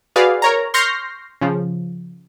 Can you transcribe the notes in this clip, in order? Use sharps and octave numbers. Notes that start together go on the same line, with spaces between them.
F#4 G#4 B4 D5 F5
A#4 C#5 A#5
C6 C#6 F6 G6 A#6 C7
C#3 F3